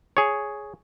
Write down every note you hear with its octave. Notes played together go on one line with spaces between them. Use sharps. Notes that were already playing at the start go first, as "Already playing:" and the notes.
G#4 C#5